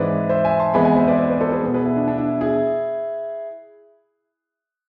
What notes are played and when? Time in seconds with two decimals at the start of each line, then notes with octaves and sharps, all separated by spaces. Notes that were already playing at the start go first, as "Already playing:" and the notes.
Already playing: G#2 E3 G#3 C4 B4 D5
0.29 C5 E5
0.45 E5 G#5
0.59 A5 C6
0.74 F2 E3 G#3 B3 G#5 B5
0.85 G#5 B5
0.96 C5 E5
1.07 B4 D5
1.18 C5 E5
1.29 B4 D5
1.41 A4 C5
1.52 G#4 B4
1.63 B2 B3
1.74 G#4 B4
1.85 E4
1.96 D4
2.08 D4
2.18 E4
2.41 E4 G#4